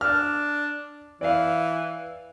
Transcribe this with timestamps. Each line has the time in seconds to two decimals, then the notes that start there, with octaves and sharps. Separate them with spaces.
0.01 D4 F6
1.21 E3 D5 F5